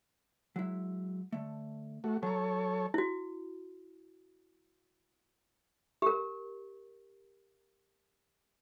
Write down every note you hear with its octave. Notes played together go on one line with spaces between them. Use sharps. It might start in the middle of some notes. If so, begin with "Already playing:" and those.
F#3 G#3 E4
D3 A3
A3 F#4
F#3 A4 C#5 A#5
E4 F#4
G4 A#4